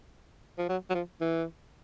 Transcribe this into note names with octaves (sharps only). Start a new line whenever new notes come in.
F3
F#3
F#3
F3
E3